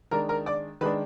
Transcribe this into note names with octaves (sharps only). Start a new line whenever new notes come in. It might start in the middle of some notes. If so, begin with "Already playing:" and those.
D#3 G#3 D4 A#4 A#5
A#4 A#5
D5 D6
D#3 G#3 D4 B4 B5